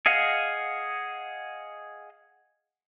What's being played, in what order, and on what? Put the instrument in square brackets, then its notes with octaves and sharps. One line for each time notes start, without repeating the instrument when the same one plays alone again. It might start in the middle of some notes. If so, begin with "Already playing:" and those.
[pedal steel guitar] G#4 D#5 F5 F#5